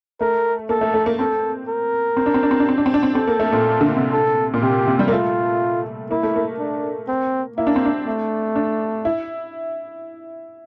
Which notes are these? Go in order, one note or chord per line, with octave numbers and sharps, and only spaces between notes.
A3 A#4
A#3 A4
A3
A3
A#3
C4 A4
A#4
C4
D4
C4
D4
C4
D4
C4
D4
C4
D4
C4
C4 A4
A#3
A3
A#2
D3
C3
A4
A#2
C3 G4
C3
G3
A#3
A3 F4
A#3 E4
A3
A#3
D4
C4
A#3 E4
D4
C4
D4
A3
D4
E4